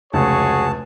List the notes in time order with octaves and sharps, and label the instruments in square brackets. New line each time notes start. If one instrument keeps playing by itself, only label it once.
[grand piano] F1 C#2 [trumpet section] F#4 G#4 C#5 [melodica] A5